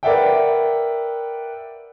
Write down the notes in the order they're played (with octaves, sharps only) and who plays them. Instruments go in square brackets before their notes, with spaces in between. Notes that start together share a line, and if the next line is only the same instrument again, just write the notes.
[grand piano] A#4 B4 D5 E5 F#5 G5